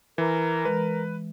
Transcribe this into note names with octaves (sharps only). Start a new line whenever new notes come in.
E3 A#4
E3 G#3 B4